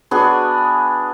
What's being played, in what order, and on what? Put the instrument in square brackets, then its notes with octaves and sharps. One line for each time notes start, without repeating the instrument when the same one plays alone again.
[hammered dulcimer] B3 D4 F#4 G#4